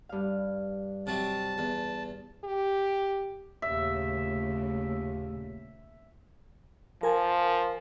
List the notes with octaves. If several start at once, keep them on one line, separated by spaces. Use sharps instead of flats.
G2 F5
C3 F#3 A5
E2
G4
D#2 A#2 C#3 A3 E5
F3 A#4 G#5